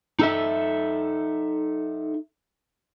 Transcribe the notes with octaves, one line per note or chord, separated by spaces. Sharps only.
D#4 A4 E5